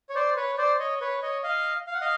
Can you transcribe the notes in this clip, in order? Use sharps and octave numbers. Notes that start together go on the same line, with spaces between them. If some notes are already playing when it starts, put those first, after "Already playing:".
C#5
C5 D5
B4 C#5
C5 D5
C#5 D#5
B4 C#5
C#5 D#5
D#5 F5
F5
F#5
D#5 F5